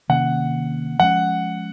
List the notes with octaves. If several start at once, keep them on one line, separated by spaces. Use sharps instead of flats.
C3 D#3 A#3 C#4 F#5
F3 G#3 C#4 F#5